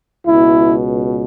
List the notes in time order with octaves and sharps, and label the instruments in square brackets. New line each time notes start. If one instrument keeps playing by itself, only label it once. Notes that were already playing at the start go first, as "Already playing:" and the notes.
[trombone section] C#2 B2 E4